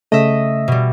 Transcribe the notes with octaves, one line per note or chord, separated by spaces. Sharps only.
C#3 A3 D#5 E5
B2 G3